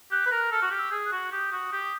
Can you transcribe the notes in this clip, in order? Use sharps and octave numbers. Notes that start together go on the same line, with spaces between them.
G4 F#6
B4
A#4
A4 F6
F#4
G4 F6
E6
G#4
F#6
F#4
G4 D#6
F#4
G4